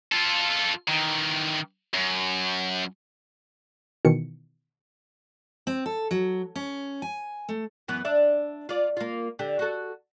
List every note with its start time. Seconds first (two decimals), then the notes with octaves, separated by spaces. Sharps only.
0.12 F4 A4
0.88 D#3 E3
1.94 F#2
4.05 B2 D#3 E3 C#7
5.67 C4
5.86 A4
6.11 F#3
6.56 C#4
7.02 G#5
7.49 A3
7.88 F#2 E3 B3
8.05 D4 E5
8.69 F4 D5
8.97 A#3 F4
9.39 D3 G4
9.59 F#4 A4